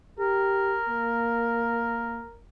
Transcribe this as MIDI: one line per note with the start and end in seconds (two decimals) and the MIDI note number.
0.19 0.78 67
0.19 2.38 70
0.89 2.22 58